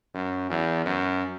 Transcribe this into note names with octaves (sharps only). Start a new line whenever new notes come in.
F#2
E2
F#2